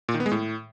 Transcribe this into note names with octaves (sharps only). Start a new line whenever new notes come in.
A#2
D#3
B3
G#3
A2